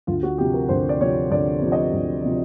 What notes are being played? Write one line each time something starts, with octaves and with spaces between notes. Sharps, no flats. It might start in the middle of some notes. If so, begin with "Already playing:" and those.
D2 F4
F#4
C3 F3 G4
A#4
D2 C5
D5
C3 F3 C#5
D2 D5
C3 F3
D#5
D2
C3 F3